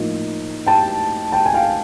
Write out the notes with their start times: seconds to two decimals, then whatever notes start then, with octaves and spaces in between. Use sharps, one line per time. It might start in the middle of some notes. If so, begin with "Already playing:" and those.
Already playing: A2 F3 A#3 D#4
0.67 G5 A5
1.32 G5 A5
1.46 G#5
1.54 F5 G5